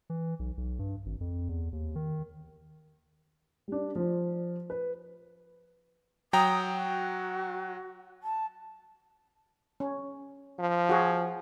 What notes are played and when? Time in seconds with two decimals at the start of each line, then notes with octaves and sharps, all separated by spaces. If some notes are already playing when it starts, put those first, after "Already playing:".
0.10 E3
0.39 B1
0.57 B1
0.79 G2
1.06 G#1
1.21 F2
1.49 E2
1.73 D#2
1.96 D#3
3.68 G3 D4
3.95 F3 C5
4.70 B4
6.33 F#3 G5 A#5 D#6
6.69 F#4
8.23 A5
9.80 C#4
10.59 F3
10.89 F#4 G#4